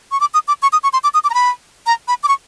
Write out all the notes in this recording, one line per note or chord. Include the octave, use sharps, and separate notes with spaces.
C#6
D6
D#6
D6
C#6
D#6
C#6
C6
D6
D#6
D6
A#5
B5
A#5
B5
D6
C#6